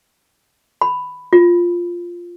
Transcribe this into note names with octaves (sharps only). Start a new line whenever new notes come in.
B5
F4